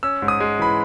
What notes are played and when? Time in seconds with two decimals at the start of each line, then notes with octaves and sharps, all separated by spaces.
0.03 C#4 E6
0.22 G#2
0.28 D#6
0.40 G#3
0.59 E3 B5